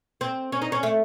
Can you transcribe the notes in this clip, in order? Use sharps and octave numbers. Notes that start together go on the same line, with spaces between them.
C4
C#4
D#4
C#4
A3